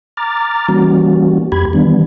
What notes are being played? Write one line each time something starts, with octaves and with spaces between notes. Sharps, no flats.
A#5 D6 F6 A6
E3 G3 A#3 C#4 F#4
F2 G4 B5 G#6
D#3 E3 G3 B3 D4